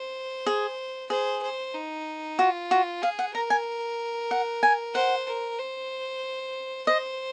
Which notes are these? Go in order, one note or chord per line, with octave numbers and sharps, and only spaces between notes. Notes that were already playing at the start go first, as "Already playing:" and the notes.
Already playing: C5
G#4
G#4 C5
C5
D#4
F4 F#4
F#4
G#4 F5
F#5
A#4 A#5
G#5
F#5
G#5
C5 F#5
A#4
C5
C5 D#5